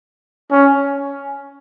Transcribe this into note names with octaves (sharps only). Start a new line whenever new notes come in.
C#4